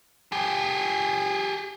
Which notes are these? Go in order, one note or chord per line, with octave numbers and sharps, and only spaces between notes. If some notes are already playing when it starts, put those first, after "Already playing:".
G4 G#4